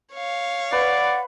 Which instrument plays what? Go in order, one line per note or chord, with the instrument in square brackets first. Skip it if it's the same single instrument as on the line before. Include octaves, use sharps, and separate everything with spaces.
[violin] C#5 F5
[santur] B4 [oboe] D5 [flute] F#5